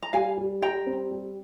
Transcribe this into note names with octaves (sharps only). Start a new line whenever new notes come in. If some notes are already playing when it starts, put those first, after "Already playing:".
A#5
G3 F5 G#5
G3
G3 G5 A#5
C4
G3